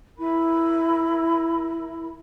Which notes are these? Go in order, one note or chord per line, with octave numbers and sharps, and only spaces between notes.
E4 A#4 B5